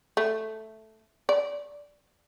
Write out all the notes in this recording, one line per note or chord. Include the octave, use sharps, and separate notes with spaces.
A3
D5